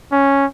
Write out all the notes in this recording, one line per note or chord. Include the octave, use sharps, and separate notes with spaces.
C#4